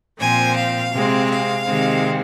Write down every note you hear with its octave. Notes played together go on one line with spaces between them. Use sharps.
A#2 F3 C4 G#5
F5
C3 G#3 C4
F5
C3 D#3 G#3 C4